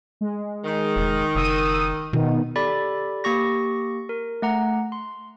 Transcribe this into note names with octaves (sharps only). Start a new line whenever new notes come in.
G#3
D#3
F1
F#1 D#6 E6 D#7
B2 D#3 B3
G4 A4 D5 B5 A6
A#3 G4 C#6 A#6
A#4
A3 F#5 A#5
C6